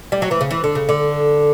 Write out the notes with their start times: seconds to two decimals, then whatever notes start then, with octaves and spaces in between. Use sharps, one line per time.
0.12 G3
0.22 F#3
0.31 E3
0.41 C#3
0.51 E3
0.64 D3
0.75 C#3
0.89 D3